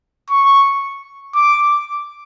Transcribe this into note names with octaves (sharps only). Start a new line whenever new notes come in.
C#6
D6